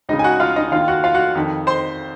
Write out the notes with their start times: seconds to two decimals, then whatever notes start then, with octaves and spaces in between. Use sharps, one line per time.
0.09 C#2 C#3 D#4 D#5
0.19 G#5
0.24 F#4 F#5
0.40 F4 F5
0.56 D#4 D#5
0.72 D#2 D#3 F4 F5
0.88 F#4 F#5
1.04 F4 F5
1.15 F#4 F#5
1.35 F2 D#3
1.67 C5 C6